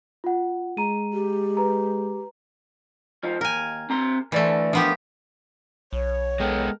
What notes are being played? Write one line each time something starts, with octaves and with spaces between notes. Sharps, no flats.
F4 F#5
G#3 A#5 D#7
G4
B4 A#5
F3 D#4
D#2 A#4 G#5
C4 A#5 C6
D2 E3 A3 D5 E5
F3 B3 D4 G4 A#4
B1 C#5
G#3 B3 A4 A#4 G5